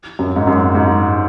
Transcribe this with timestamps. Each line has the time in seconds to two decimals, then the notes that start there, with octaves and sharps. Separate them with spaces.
0.19 F#2
0.36 G#2
0.47 F#2
0.75 G#2